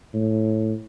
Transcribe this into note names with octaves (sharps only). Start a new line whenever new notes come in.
A2